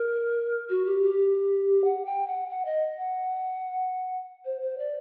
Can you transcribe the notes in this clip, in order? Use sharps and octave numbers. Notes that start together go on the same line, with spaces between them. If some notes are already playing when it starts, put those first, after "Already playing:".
Already playing: A#4
F#4
G4
G4
F#5
G5
F#5
F#5
D#5
F#5
C5
C5
D5